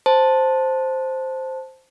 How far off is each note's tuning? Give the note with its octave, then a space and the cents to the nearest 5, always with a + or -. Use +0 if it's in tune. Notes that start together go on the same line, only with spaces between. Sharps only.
C5 +0 A5 +0